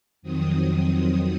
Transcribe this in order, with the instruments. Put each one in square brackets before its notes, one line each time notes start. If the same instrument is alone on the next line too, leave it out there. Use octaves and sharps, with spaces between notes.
[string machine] F2 D#3 F#3 C4 D#6